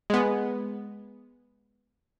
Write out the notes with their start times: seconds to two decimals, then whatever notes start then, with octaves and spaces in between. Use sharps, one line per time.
0.10 G#3 B3